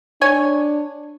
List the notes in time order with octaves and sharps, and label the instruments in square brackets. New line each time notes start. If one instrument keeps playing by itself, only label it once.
[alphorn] D4 [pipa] C#5 G#5